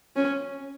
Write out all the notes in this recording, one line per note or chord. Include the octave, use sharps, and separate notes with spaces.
C#4